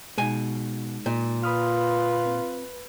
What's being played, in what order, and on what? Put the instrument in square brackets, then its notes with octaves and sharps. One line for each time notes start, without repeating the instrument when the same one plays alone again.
[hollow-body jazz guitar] B2 G#5 [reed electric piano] G#3 D#4
[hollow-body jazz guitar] A#2
[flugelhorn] F4 [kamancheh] B4 [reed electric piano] B5 D#6 F6
[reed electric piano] C4